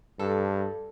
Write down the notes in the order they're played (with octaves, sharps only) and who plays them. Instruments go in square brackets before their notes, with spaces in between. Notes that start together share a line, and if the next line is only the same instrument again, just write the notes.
[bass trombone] G2 [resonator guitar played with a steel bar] A4